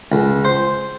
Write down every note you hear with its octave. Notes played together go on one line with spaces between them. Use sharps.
C#2
C5